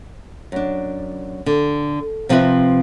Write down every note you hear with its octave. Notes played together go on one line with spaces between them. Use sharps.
F#2 D4
D3
C3 F3 C4 A4 B4 E5